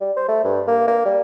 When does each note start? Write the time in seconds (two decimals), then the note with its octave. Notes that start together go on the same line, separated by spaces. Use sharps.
0.01 G3
0.17 C5
0.29 A3
0.44 G2
0.68 A#3
0.88 A#3
1.05 G3